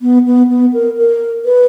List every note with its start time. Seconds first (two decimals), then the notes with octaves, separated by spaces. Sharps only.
0.02 B3
0.26 B3
0.49 B3
0.73 A#4
0.98 A#4
1.45 B4